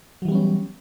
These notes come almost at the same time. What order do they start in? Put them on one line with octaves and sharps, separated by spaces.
F#3 E3 G3 B3 C#4